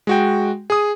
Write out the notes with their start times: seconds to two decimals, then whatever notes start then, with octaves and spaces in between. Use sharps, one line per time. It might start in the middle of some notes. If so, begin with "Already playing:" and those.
0.07 G#3 F#4 G5
0.70 G#4 D#6